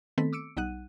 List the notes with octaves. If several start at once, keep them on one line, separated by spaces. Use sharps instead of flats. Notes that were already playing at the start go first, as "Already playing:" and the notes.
D#3 A3 B3 C4 A4 B6
D6 E6 C#7 D7
B1 G3 D#4 F#5 F#6 D#7